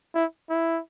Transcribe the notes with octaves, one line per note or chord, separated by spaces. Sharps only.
E4
E4